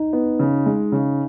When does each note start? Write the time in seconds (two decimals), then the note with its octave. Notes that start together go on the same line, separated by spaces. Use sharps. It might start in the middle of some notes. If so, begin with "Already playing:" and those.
Already playing: D#4
0.13 B3
0.39 C#3
0.66 G#3
0.92 C#3